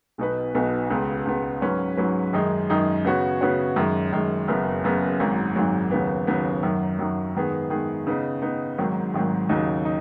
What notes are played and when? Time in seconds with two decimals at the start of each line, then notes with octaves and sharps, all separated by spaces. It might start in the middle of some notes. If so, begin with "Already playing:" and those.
0.18 B1 B2 B3 D#4 B4
0.55 B1 B2 B3 D#4 B4
0.90 C#2 C#3 B3
1.26 C#2 C#3 B3
1.62 G#2 F#3 C#4 B4
1.97 G#2 F#3 C#4 B4
2.33 F#2 D#3 G#3 D#4 G#4
2.70 F#2 D#3 G#3 D#4 G#4
3.05 C#3 B3 F#4 C#5
3.41 C#3 B3 F#4 C#5
3.76 F#2 D#3 G#3
4.12 F#2 D#3 G#3
4.48 F#1 F#2 C#3 B3
4.84 F#1 F#2 C#3 B3
5.20 G#1 G#2 F#3
5.56 G#1 G#2 F#3
5.91 D#2 C#3 F#3 B3
6.27 D#2 C#3 F#3 B3
6.63 F#2 D#3 F#3
6.99 F#2 D#3 F#3
7.35 G#2 D#3 B3 G#4
7.70 G#2 D#3 B3 G#4
8.07 C#3 B3 D#4
8.42 C#3 B3 D#4
8.78 G#1 G#2 D#3 F#3
9.14 G#1 G#2 D#3 F#3
9.49 D#2 C#3 F#3 D#4
9.85 D#4